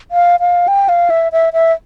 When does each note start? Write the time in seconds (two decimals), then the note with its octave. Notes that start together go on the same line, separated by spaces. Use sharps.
0.11 F5
0.40 F5
0.68 G5
0.89 F5
1.10 E5
1.32 E5
1.53 E5